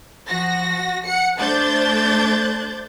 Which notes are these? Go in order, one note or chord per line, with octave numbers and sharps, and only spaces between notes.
F3 F#4 A#6
F#5 C#7
A3 D4 C5 G6 A6